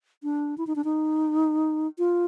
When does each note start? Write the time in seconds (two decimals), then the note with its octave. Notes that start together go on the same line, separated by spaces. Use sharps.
0.23 D4
0.58 E4
0.67 D#4
0.76 D4
0.84 D#4
1.98 F4